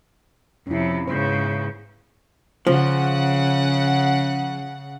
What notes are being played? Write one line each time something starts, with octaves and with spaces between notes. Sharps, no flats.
F2 C3 C#4 E4
G#2 C#3 B3 C5
C#3 F3 F#5